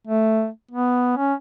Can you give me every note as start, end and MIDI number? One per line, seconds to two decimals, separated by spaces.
0.07 0.48 57
0.71 1.12 59
1.17 1.34 61